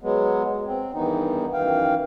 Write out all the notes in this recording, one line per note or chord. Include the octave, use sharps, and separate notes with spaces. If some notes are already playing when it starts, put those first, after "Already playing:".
F#3 G#3 B3
C4
E2 G2 D#3 E3 B3 D#4
F#2 D#3 E3 F5 G5